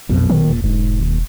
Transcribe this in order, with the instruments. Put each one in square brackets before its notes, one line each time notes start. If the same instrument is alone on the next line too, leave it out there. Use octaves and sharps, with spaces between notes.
[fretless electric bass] A#1 B2 F#3 [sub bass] F2
[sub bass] D#3
[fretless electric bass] E1 A#2
[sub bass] E1 [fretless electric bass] G#2
[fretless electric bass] D#2